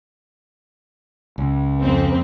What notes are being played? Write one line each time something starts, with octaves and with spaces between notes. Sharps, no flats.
C#2
F2 C4